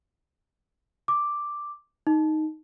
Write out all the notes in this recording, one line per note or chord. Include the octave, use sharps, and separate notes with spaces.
D6
D#4